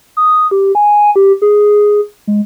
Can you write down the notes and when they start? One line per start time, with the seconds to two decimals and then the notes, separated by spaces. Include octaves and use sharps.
0.17 D#6
0.51 G4
0.75 G#5
1.16 G4
1.42 G#4
2.27 G#3